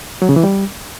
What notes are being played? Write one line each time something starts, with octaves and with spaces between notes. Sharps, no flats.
F#3
C#3
E3
G3